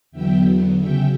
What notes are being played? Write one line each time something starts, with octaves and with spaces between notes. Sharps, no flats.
E2 D3 F#3 B3 E5 G5
C#3 F#3 C#4 E5 G5